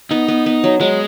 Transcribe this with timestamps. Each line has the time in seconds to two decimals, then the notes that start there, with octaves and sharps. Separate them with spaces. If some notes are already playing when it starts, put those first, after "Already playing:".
0.11 B3 D#4
0.28 B3
0.46 B3
0.64 F#3
0.80 F#3 G#3